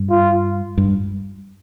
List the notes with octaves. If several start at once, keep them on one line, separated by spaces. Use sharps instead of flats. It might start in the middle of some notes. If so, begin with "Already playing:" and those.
Already playing: G2
F4
G2